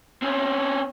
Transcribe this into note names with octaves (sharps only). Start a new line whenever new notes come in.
C4 C#4